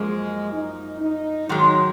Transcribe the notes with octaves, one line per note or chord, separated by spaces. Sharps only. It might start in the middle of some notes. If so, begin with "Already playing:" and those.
Already playing: F#2 F3 G#3 A#3
D#4
D#4
G#2 D#3 F#3 G#3